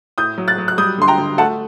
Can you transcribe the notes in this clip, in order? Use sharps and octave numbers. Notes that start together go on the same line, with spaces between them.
A2 D#6 G6
F#3
F#6 A6
F#3
F#6
G3 D#6 G6
D3 C6
G5 A#5
D3
A3 F#5 A5